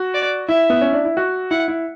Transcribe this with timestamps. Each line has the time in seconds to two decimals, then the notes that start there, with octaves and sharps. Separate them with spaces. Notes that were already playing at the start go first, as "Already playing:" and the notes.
Already playing: F#4
0.14 D5
0.48 E4 E5
0.70 B3
0.81 C#4
0.93 D4
1.05 E4
1.17 F#4
1.51 E4 F#5
1.68 E4